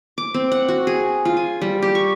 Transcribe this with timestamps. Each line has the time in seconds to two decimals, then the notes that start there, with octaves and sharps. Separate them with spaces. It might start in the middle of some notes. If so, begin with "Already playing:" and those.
0.18 D6
0.34 C4
0.52 F#5
0.68 F#4
0.87 G#4
1.25 F4
1.37 G#5
1.62 G3
1.82 G4
1.95 C#6